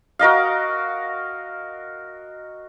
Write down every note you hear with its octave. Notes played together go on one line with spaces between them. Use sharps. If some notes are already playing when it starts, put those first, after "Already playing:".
F#4 A#4 D#5 F5